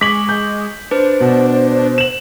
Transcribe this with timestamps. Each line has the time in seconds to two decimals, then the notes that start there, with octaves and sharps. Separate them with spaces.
0.01 G#3 C#6 D6 B6 F#7
0.29 G6
0.91 D4 B4 C5
1.20 B2
1.98 E7 F#7